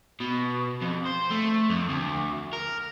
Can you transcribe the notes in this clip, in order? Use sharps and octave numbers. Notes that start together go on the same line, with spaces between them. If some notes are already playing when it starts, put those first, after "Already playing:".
B2
F2
C5
A3
F2
D2
A#4